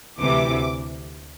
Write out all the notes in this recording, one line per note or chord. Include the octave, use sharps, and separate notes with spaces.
D2 C3 E3 D6